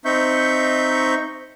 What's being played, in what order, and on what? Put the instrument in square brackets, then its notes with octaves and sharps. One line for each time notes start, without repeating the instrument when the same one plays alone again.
[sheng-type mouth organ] C4 D#4 E5 C#6 G6